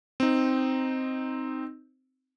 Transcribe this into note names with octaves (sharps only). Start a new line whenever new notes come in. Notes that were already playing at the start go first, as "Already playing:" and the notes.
C4 D#4